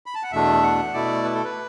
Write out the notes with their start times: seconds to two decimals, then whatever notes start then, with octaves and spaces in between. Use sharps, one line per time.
0.06 B5
0.15 A5
0.23 F#5
0.32 E2 B2 A3 D4 E5
0.63 F#5
0.93 B2 A3 E4 D5
1.24 B4
1.34 A4
1.44 B4